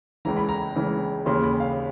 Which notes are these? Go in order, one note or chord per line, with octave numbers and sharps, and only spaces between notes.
C#2 C#3 E3 A#5
B5
A#5
C#2 C#3 E3
D#2 C#3 E3 C6
B5
F5